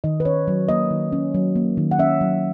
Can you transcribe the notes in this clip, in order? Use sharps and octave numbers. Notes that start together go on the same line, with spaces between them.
D#3 D#5
B4
C#4 C#5
F#3
A#3 D#5
D#3
C#4
F#3
A#3
D#3
F#5
C#4 E5
F#3